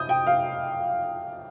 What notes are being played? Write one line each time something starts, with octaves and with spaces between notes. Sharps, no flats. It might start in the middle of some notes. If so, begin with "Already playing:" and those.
Already playing: D#6 G6
G5
F5